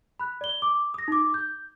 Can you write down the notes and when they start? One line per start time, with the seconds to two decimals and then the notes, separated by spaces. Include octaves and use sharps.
0.20 B5 F#6
0.41 D5 G7
0.62 D6
0.94 D#6 A#6
1.08 D#4 D6
1.34 G6